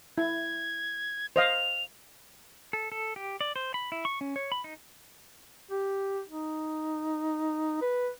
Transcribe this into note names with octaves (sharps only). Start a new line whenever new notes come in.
E4 G#6
C5 D#5 F5 F7
A4
A4
G4
D5
C5
B5
E4
C#6
C#4
C#5
B5
D#4
G4
D#4
B4